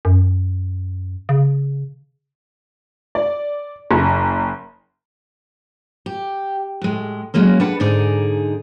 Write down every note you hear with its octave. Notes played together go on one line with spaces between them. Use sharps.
F#2
C#3
D5
F#1
G4
A2 G#3
F#3 G#3 A#3 C#4
D4 B4 F#5
G#2 D3 D#4 G#4 D5